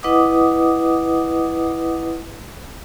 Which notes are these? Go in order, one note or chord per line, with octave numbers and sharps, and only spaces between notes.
E4 B4 D#5 F#5 D6 D#6